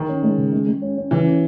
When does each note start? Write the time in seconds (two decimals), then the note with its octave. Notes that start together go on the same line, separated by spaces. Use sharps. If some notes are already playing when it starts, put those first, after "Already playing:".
Already playing: D#3
0.08 C#4
0.23 G#3
0.38 C#3
0.52 G#3
0.67 G#3
0.82 C#4
0.97 C#4
1.11 C#3 E3
1.27 C#4